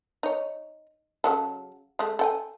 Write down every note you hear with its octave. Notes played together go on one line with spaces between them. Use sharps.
D#4 C#5
C#3 F#3 A4
G#3 A3
A4 G5 G#5